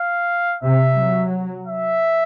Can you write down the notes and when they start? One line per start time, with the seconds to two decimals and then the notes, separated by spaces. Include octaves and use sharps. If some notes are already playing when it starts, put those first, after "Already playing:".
Already playing: F5
0.63 C3 E5
0.98 F#3
1.67 E5